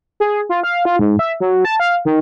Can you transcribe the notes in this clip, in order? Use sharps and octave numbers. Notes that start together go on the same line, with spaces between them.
G#4
F4
F5
F4
G#2
E5
F#3
A5
F5
D#3